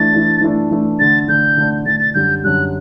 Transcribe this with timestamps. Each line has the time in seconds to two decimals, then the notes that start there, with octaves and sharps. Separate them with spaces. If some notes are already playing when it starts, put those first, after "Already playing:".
Already playing: E3 A3 D4 A6
0.13 E3 A3 D4
0.41 E3 A3 D4
0.71 E3 A3 D4
0.99 D3 A3 D4 A6
1.28 D3 A3 D4 G6
1.57 D3 A3 D4
1.86 D3 A3 D4 A6
2.00 A6
2.14 F#2 D3 G3 G6
2.44 F#2 D3 G3 F#6